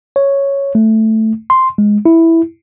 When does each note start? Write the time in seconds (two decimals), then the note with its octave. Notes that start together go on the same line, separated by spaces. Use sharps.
0.16 C#5
0.75 A3
1.50 C6
1.78 G#3
2.06 E4